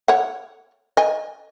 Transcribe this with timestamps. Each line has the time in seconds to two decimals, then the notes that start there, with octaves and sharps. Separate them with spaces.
0.08 C#5 F#5
0.97 D#5 G#5